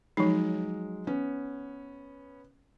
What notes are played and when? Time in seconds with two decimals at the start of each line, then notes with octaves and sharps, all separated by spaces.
0.17 F3 F#3 G#3 D#4
1.07 B3 C#4